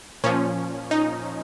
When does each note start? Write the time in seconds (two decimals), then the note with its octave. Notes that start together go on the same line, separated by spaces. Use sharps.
0.24 A#2 F3 C#4
0.91 D#4